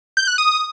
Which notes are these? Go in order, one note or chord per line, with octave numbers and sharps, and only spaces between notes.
G6
F#6
D#6